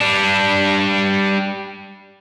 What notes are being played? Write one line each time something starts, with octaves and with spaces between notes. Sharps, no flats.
G3 D4